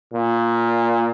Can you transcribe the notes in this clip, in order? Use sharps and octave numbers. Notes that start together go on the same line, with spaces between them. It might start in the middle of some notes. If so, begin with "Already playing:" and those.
A#2